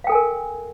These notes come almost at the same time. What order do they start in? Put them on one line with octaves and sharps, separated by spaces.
F5 G5 A4 G#5 A#4